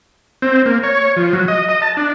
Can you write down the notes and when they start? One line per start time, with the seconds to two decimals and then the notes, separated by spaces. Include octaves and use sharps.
0.42 C4
0.66 A#3
0.83 C#5
1.17 F3
1.33 F#3
1.48 D#5
1.69 D#5
1.82 A5
1.97 D4